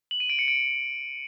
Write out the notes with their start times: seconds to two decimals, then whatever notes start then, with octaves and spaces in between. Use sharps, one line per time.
0.11 F#7
0.20 D#7
0.30 D7
0.39 C#7
0.48 D7